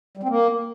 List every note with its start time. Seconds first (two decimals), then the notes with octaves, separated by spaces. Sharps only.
0.17 G3
0.23 C4
0.29 A#3